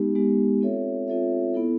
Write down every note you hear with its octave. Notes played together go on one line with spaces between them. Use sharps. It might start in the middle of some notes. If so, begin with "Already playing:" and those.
Already playing: G#3 B3 D#4 G4
G#3 B3 D#4 G4
C4 F4 A4 C#5 E5
C4 F4 A4 C#5 E5
B3 E4 A4